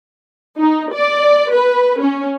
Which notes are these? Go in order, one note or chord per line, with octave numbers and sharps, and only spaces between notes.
D#4
D5
B4
C#4